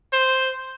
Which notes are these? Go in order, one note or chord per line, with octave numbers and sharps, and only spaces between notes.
C5